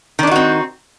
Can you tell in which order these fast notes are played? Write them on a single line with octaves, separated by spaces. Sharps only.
D#3 D4 D#4 F#4 C4